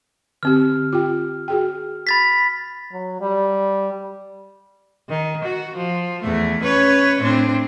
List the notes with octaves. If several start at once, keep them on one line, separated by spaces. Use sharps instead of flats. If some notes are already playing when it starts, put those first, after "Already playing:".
D3 C4 G4 F6
F4 G4 G5
F#4 G#4 G5
B5 A6 B6
F#3
G3
D#3
F#4
F3
E2 A3
C#4 B4 C#5
A2 C4 D4